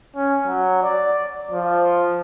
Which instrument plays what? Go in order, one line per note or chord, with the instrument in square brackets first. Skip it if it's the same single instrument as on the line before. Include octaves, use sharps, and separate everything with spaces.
[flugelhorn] C#4
F#3
D5
F3